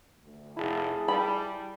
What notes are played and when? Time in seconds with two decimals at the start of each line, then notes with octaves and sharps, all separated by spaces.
0.24 D2
0.57 F1 E4 G#4 A5
1.08 G3 B5